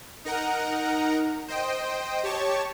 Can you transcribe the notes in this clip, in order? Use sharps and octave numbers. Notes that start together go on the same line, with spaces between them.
D#4 A#4 F#5 A#5
C5 D#5 G5
G4 C#5 A5 C#6